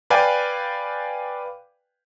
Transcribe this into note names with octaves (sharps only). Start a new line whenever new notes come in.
B4 D5 F5 G5 G#5